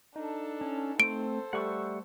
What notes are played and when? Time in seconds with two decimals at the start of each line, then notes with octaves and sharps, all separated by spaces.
0.16 D4 D#4 A4
0.61 C#4
1.00 A3 C4 A4 C5 D7
1.53 G3 A3 F#5 C#6 E6